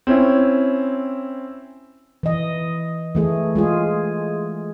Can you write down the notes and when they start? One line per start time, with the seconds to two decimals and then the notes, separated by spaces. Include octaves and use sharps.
0.07 C4 C#4 E4
2.23 E3 D#5
3.15 E3 A3 G#4
3.55 G#3 F4 G#4